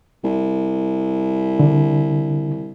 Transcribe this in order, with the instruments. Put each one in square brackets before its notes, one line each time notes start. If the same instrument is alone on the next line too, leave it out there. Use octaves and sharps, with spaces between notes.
[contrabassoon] C2
[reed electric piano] D3